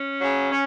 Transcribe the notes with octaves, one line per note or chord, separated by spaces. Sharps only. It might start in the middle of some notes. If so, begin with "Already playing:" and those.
Already playing: C#4
C#3 F#3
C#4